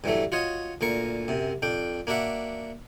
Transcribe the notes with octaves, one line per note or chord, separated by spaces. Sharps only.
G2 E3 F#3 A3
F4 F#4 C#5 D#5
D2 A#2 A#4 C#6
F#2 C3
F2 D4 G5
A#3 D4 F#4 E5 F#5